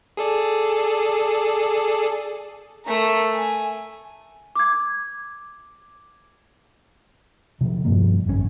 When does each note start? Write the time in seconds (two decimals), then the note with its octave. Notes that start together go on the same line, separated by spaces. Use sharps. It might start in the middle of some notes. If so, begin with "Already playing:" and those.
0.17 G#4 A4 D5
2.85 A3 A#4
3.35 G#5
4.55 D6 G#6
7.61 C3 F3 F#3
7.85 E1 G2 F3 A#3
8.26 G#1 F#2 B2 C#4